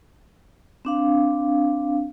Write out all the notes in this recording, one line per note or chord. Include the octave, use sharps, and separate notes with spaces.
C4 D4 F5